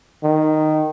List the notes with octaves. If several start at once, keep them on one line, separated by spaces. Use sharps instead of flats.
D#3